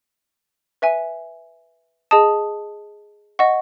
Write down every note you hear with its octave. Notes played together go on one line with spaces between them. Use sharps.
B4 E5 G#5
G#4 D#5 A5 D#6
D#5 F#5 C#6